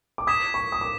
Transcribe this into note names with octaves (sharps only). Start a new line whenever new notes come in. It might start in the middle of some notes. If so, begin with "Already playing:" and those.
D6
D#6 G#6 B6 E7
C#6
D#6
D6